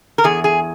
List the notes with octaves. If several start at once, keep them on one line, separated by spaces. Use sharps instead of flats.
A#4
E2 G#4
G#4